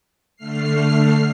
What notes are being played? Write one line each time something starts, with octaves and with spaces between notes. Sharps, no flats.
D3 A3 F6 C7